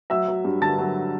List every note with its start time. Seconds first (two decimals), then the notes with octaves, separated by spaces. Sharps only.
0.10 F#3 E5 E6
0.28 F#3
0.45 G2
0.62 D3 A5 A6
0.78 F#3